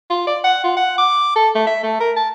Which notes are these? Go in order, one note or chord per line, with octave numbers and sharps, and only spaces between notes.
F4
D5
F#5
F4
F#5
D6
A4
A3
E5
A3
A#4
A5